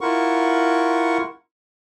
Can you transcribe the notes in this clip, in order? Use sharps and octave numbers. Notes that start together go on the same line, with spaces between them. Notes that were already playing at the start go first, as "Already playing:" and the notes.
E4 F4 A#4 F#5 C#6